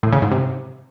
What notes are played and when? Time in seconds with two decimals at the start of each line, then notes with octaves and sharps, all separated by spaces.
0.03 A2
0.13 C#3
0.22 G#2
0.32 C3